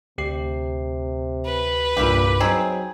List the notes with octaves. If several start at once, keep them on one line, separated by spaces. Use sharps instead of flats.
D2 C3 G4 C7
B4
C2 G2 A#2 E4 F4 G4
F#3 C4 D#4 G#4 G5 G#5